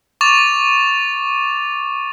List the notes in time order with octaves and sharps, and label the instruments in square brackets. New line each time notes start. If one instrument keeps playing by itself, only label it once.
[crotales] C#6 D6 A6 F7